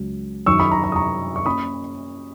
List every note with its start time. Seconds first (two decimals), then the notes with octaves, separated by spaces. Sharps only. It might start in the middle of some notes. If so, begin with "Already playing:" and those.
Already playing: C#2 C#3 F#3
0.46 F#2 D#3 F#3 C#6 E6
0.59 B5 D#6
0.71 A#5 C#6
0.84 A#5 C#6
0.92 D#6
0.96 A#5 C#6
1.36 C#6
1.46 A#3 C#4 B5 D#6